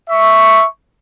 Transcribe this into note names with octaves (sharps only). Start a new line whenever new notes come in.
E5 C#6